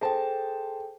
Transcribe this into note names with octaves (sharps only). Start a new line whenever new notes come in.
G#4 A4 C5 G5 A5